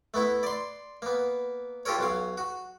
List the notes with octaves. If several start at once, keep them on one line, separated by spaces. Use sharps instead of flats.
A3 B3 E4
D5 C6
A#3 B3
F4 G4 A4 A#4 C#5
B1 F#3 F5
F#4